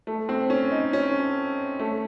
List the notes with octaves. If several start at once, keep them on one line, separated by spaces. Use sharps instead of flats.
A3
C4
C#4
D#4
C#4
A3